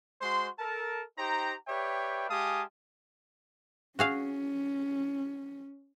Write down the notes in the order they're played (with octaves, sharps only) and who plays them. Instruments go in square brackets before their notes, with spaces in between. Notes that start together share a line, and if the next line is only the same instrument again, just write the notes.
[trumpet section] G#3 F#4 C5 C6
A4 A#4 A5
D#4 G4 C5 G5 A#5
G4 B4 C#5 D5 E5 G5
G#3 G4 F5 G#5 A5 D#6
[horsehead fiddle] C#4 [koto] F#4 G#4 F5